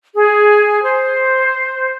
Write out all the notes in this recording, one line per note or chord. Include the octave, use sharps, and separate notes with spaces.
G#4
C5